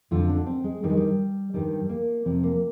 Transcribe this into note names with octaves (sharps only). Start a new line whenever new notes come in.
F2 D3 F3 F4
D4
C4
G#3
G2 D#3 G3
G#3
G3
G2 D#3 G3
A#3
F2 C3 F3 C4
A#3